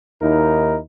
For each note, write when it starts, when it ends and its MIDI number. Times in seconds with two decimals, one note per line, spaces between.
0.21 0.78 39
0.21 0.78 63
0.21 0.78 64
0.21 0.78 70